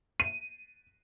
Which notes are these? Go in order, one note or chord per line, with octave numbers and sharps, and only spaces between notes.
D#7